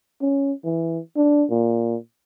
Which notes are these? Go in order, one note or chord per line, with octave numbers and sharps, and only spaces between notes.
C#4
E3
D4
A#2